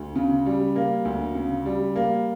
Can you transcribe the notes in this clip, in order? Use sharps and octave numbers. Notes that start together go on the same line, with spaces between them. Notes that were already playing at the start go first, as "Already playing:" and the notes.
Already playing: D2
C#3
G3
A#3
D2
C#3
G3
A#3